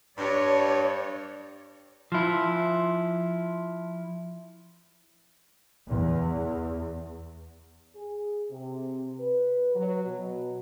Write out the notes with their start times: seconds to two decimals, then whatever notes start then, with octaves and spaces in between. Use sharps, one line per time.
0.18 G2 C#5 D5
2.12 F3 E4
5.88 E2
7.96 G#4
8.51 C3
9.19 B4
9.75 F#3
10.06 B2